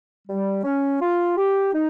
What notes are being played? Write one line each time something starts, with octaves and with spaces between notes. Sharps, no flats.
G3
C#4
F4
G4
D#4